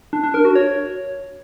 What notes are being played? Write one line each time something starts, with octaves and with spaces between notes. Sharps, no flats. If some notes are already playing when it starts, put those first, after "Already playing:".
D4
D4
A#4
F#4
C#5